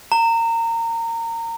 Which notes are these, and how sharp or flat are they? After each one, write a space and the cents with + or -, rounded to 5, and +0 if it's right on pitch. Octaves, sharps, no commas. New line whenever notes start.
A#5 -25